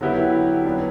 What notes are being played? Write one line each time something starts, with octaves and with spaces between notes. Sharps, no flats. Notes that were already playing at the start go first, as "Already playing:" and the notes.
D3 F#3 B3 E4 G4
F#3 B3 D4